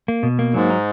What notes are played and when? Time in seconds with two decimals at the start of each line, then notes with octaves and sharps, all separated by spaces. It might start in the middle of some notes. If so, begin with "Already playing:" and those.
0.08 A#3
0.23 B2
0.39 A#3
0.54 G#2 F#3
0.70 D#4